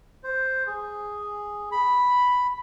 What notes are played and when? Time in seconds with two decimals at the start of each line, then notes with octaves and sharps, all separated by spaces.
0.24 C5
0.67 G#4
1.72 B5